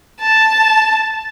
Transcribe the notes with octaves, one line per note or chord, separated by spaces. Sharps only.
A5